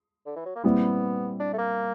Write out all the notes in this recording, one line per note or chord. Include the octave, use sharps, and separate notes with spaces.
D3
E3
F#3
A#3
A#2 G3 B3 C4 E4
D4
A3
A#3